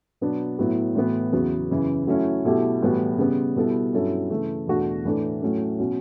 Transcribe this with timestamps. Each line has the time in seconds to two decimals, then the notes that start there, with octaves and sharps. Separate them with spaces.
0.21 B2 F#3 B3 D4
0.59 A2 F#3 B3 E4
0.95 A2 E3 B3 F#4
1.32 E2 C#3 F#3 B3
1.70 F#2 C#3 E3
2.07 F#3 A3 C#4 E4
2.45 B2 F#3 A3 E4 G4
2.82 A2 E3 G3 B3 F#4
3.18 C#3 G3 B3
3.56 B2 G3 B3 E4 A4
3.93 G2 F#3 C#4 E4 A4
4.30 C#3 E3 A3
4.67 E2 B2 A3 D4 F#4
5.05 A2 E3 A3 D4 A4
5.42 A2 F#3 A3 C#4
5.79 B2 F#3 C#4